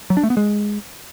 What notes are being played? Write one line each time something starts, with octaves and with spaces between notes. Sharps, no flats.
F#3
D4
A3
B3
G#3